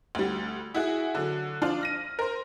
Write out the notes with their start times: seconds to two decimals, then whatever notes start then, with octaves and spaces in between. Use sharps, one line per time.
0.15 D2 G3
0.74 E4 F#4 G#4
1.15 D3 F#3
1.62 F3 D4 F4
1.81 F6 A#6 D#7
2.19 A#4 C5